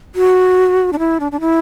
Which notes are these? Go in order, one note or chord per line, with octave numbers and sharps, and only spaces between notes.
F#4
D4
E4
D4
D4
E4